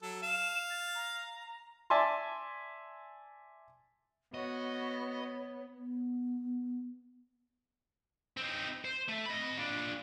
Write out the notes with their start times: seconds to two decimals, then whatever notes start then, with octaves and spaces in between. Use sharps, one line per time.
0.02 F#3 A4
0.22 F5 E7
0.70 A6
0.95 A#5
1.90 D5 E5 G#5 A5 C6
4.34 B3 F#4 C#5 D#5
5.77 B3
8.37 C4 D#4
8.85 C5
9.08 A3
9.25 D#5 B5
9.57 A#2 D4